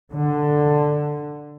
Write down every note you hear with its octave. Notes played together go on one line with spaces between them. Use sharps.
D3